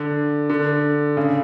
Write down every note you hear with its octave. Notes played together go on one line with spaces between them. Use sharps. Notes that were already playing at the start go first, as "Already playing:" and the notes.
Already playing: D3
D3
C#3